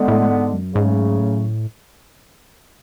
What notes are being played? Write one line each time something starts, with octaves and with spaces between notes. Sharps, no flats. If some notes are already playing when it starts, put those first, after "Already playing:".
Already playing: D3 G#3 B3
A2
G#2
F#2
G#2 C#3 F#3 A3 C#4
A2